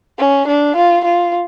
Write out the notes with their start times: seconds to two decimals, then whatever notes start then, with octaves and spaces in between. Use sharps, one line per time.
0.19 C#4
0.47 D4
0.76 F4
1.05 F4